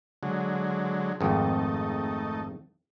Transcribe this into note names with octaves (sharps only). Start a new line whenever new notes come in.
D3 F#3 G#3
G#1 F2 A3 D#4